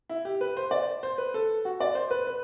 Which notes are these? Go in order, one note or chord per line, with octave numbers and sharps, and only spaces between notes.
E4
G4
B4
C5
D5
C5
B4
A4
F#4
D5
C5
B4
B4